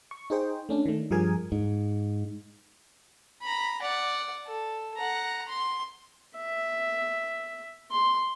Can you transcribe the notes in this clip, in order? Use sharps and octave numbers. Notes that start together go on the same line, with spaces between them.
C#6
D#4 G#4 C5 G5
A3 C#4 D4
D#3 A3
G2 F3 G3 G#4 A#4 G#5
G#2
A#5 B5
D5 F#5
A4
F#5 A#5
C6
E5
C6